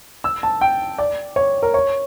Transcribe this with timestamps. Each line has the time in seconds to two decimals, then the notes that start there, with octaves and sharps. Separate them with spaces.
0.24 E6
0.43 A5
0.61 G5
0.98 D5
1.36 C#5
1.63 A#4
1.74 C#5